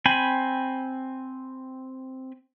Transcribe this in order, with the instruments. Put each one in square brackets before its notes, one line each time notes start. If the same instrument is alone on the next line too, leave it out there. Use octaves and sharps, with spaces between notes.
[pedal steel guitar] C4 G5 G#5 B5